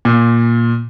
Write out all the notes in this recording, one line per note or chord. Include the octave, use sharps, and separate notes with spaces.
A#2